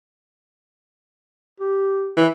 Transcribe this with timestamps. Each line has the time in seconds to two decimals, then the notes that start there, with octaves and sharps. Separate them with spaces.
1.60 G4
2.17 E3